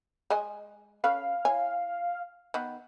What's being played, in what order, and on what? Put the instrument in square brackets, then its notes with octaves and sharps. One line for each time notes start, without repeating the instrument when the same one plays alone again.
[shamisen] G#3 D#5 G#5
[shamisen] C#4 A4 B4 [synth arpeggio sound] F5
[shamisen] E4 C#5 G#5
D#3 B3